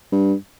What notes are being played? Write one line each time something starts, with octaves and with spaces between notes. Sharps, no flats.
G2